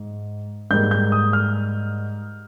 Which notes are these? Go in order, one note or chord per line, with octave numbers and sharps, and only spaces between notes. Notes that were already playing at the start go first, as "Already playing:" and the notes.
Already playing: G#2
G#2 G3 A#3 G6
G6
D#6
F6